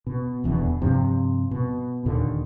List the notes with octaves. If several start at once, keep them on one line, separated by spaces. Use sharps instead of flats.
B2
D#1 E2 B2 D3
G2 C3 F3
B2
D#2 A#2 D3 D#3